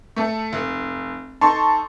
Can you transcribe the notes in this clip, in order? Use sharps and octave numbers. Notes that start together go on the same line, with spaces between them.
A3 A4
F1
D#4 A4 A5 C6 C#6